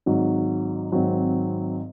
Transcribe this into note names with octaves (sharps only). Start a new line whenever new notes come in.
G#1 G#2 F#3
G#1 G#2 F#3 C4